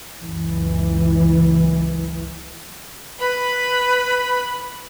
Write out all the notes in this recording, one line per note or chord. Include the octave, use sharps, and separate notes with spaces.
F#1 C#2 E3
B4 B5